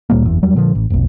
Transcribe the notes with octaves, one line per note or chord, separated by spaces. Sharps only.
D2 A#2 G3 A#3
F#1 E2
E2 F#3 G3
A#2 D3 F3
A1
F1 B1